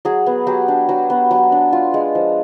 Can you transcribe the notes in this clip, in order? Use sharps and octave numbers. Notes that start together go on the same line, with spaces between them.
F#3 G#4
B3
F#3 G4
D4
F#3
B3
F#3
D4
F4
G#3
F3